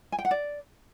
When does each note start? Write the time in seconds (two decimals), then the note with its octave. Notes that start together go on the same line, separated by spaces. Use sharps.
0.12 G#5
0.19 G5
0.25 F#5
0.31 D5